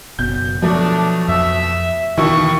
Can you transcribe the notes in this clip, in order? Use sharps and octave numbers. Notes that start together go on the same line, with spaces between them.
F#1 B2 G6
B2 F3 F#3 A3 D4
F2 E5
D#2 B2 D#3 E3 E4 C#6